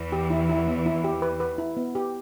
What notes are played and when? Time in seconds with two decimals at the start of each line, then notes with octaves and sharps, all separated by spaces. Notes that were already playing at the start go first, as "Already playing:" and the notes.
Already playing: E2 E3
0.12 G4
0.30 E4
0.49 E4
0.67 B3
0.86 E4
1.04 G4
1.22 B4
1.40 B4
1.58 E4
1.77 B3
1.95 G4